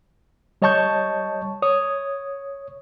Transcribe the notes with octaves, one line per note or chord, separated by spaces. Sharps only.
G3 C#5 D#5 A5 C#6 G6
C#5 D#6